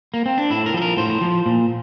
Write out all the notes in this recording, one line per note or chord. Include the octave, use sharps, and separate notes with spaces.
A#3
C4
D4
A2 E4
A#4
F3 A4
A#4
A2 C5
F3
A#2